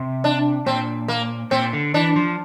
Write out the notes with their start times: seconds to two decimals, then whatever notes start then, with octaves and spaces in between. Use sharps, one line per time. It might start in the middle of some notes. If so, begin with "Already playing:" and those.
Already playing: C3
0.24 D4
0.66 A#2 C4
1.08 A#3
1.51 A#2 C4
1.73 D3
1.94 E3 D4
2.16 F3